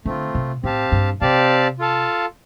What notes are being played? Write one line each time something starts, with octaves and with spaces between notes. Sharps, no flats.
D3 A3 C4 F4
C3
A2 C4 G4 F5 A5
G2
C3 C4 G4 D5 F5 A5
F4 A4 F5 A5